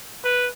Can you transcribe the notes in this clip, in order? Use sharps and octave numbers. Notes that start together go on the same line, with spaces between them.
B4